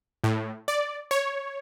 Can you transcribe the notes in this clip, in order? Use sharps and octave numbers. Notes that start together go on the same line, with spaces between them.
A2
D5
C#5